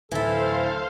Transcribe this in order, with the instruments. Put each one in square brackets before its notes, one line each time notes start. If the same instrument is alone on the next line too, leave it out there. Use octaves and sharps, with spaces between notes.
[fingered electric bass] D1 D2 [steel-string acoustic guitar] E3 E4 [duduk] A4 [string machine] C5 F5